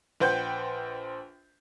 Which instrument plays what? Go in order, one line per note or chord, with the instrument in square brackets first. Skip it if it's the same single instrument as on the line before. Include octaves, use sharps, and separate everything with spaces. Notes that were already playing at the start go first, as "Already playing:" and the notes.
[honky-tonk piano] A#1 B4 C5 F#5 G5 G6